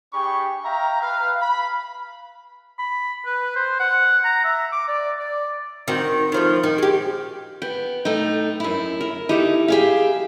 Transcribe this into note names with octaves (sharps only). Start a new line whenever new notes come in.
D4 G4 G#4 G5 B5 C#6
E5 F5 G5 A#5
B4 F5
B5
B5
B4
C5
F#5
A#5
E5
D6
D5
D5
D#3 C4 F#4
D#3 F3 A3
D#3
G#3 G4
B3 G5
A2 A3 D#4 G5
F#2 E4
A#4
D#4 E4 G4 A4
G4 G#4 E5 F5